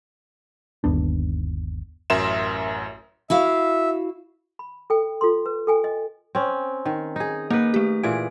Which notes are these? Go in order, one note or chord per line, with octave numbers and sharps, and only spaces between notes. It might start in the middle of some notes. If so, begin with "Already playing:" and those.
G1 D#2 B3 D4
A1 F#2 A#4 E5 C6 E7
E4 F#4 E5 F5
B5
A4 G5
F4 A4 C6
B4
A4 G5 G#5
D#5
C4 C#4
D#3
D#4 G#4
A#3 D#4 A#4 B4
A3 G4
A#2 E3 G#4 D7